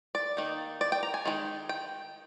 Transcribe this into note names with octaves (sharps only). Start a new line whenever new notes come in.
D5
D#3 A#3 D#4
D5
G5
A#5
G#5
D#3 G#3 C4 D#4
G5